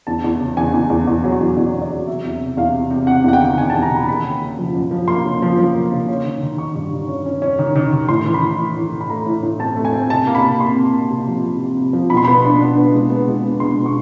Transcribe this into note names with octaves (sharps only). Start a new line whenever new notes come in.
E2 A5
E2
C#3
E2 G#5
E2
E2
E2
F#3
E2
E2 D5
E2
D5
F#3
C3 E5
E2
C3
E2 F5
C3
C3
C3 F#5
E2 F#5
G5
D#3
D#3 G#5
A5
E2
A#5
D#3
B5
A#3 B5
C#3
C#3
F3
F#2
F3
A#3 C6
C#3
F3
F3
A#3
C#3
C#4
D#3
D#3
D#3 C#6
G2
D#3
C#4
C#4
C#4
D#3
D#3
D#3
A2 C6
E3
B5
A2
A2
A2
E3
B5
A3 A#5
A2
A2
C4 A5
A3
G#5
C4
C3 A5
A#3
B5
C3
C3 C6
C3
A#3
C3
F3
C3
C3
C3
F3
B2 B5
C6
B3 B5
D4
D4
B3
G#3
B3
G#3
B3
G#3 C6
B2
C#6